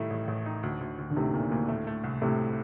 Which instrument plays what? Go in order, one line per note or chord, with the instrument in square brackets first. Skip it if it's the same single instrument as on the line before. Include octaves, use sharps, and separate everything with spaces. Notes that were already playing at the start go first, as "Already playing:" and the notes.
Already playing: [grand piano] A2 A3 D#4 [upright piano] D#3 G3
[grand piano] A1
A1
D#4
D2
D2
D2
[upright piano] D3
[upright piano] A2 C3 [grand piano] D#3
[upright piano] A#2 [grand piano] D#3
[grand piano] D2 [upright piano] A#2
[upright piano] A2 [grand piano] A3
[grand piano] A3
C2
[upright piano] A2 C3 [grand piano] A3